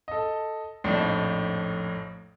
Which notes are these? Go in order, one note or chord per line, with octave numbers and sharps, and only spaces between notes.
A4 D#5
A#1 F2 A2 D4 D#4